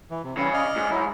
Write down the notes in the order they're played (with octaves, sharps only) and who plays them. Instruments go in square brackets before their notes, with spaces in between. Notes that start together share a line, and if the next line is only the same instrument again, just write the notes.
[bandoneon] E3
C3
[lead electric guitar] C#3 [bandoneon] E3 G3 E4
[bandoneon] D5 D#5 F6
[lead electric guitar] G#2
[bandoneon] F#3 E4